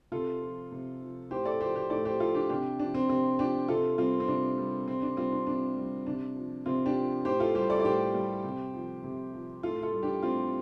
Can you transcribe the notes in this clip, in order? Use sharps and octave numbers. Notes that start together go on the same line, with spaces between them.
C3 F4 A4
F3
C3
F3
A2 G4 C5
A4 D5
F3 G4 C5
G4 C5
A2 A4 D5
G4 C5
F3 F4 A4
D4 G4
C3 D4 G4
F3 D4
C4
C3 C4
F3 D4 G4
C3 F4 A4
G3 C4 F4
C4
C3 D4
G3
C3 C4
D4
G3 C4 F4
D4
C3 D4
G3
C3 D4
F3
C3 C4 F4
D4 G4
F3
A2 G4 C5
F4 A4
G3 G4 C5
A4 D5
D5
A2 G4 C5
G3
C3
F3
C3
F3
A2 F4 A4
F4 A4
G3
D4 G4
A2 C4 F4